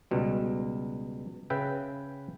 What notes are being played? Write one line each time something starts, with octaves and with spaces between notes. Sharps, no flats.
C#2 B2 G3
C#3 B4 E5 G5